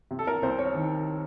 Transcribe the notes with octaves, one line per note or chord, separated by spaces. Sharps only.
C3
A4
A#4
C2 C5
C#5
D#3